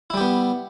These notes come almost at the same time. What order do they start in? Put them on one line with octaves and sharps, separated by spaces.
E4 G3 G4 B3